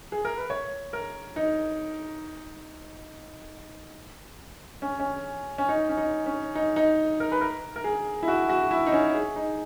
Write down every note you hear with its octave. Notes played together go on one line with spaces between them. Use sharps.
G#4
A#4
B4
C#5
A#4
D#4
C#4
C#4
C#4
D#4
C#4
D#4
C#4
D#4
D#4
A#4
B4
A#4
A#4
G#4
E4
F#4
F#4
E4
D#4
C#4
G#4
D#4